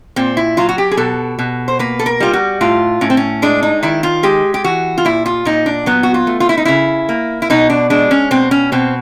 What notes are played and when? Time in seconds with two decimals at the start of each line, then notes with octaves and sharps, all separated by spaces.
0.16 A#2 C4
0.37 E4
0.57 F#3 F4
0.69 F#4
0.78 G4
0.91 G#4
0.97 B2 A4
1.39 B2
1.68 C5
1.79 A#3 B4
1.99 A4
2.06 A#4
2.20 G3 F4
2.33 F#4
2.61 A2 F4
3.01 A2 C#4
3.10 C4
3.17 C#4
3.42 G#3 D4
3.63 D#4
3.83 D#3 E4
4.03 F4
4.23 G#3 G4
4.54 G4
4.64 E3 F#4
4.98 F4
5.05 A#2 E4
5.26 F4
5.45 A#2 D#4
5.66 D4
5.86 F#3 B3
6.03 F#4
6.14 F4
6.27 A3
6.40 F4
6.49 E4
6.57 D#4
6.65 C#3 E4
7.09 A#3
7.42 E4
7.50 B2 D#4
7.70 D4
7.90 G#3 D4
8.11 C#4
8.31 B2 C4
8.51 C#4
8.72 B2 C4